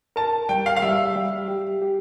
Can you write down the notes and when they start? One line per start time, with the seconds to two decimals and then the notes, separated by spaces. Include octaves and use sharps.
0.16 A#4 A5
0.49 G3 G5
0.66 F5
0.76 F5
0.82 G3 E5
1.16 G3
1.48 G4
1.82 G4